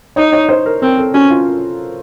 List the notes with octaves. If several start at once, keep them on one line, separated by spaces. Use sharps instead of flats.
D#4 C#5
C#5
C5
A#4
C4 A#4
A4
C#4 F#4
F4